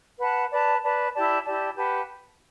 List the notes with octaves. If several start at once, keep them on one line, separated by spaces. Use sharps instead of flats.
B4 F#5 A5
B4 D5 A5
B4 D5 A5
E4 G4 D5 A5
E4 G4 D5 A5
G4 B4 F#5 A5